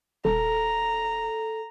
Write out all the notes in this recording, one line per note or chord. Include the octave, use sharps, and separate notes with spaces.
D#1 A4 A#5